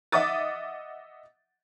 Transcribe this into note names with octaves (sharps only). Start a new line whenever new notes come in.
D#5 E5 F#5 D6 D#6 A6